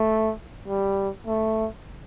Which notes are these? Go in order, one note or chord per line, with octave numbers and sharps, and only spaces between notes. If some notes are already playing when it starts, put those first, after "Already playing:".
Already playing: A3
G3
A3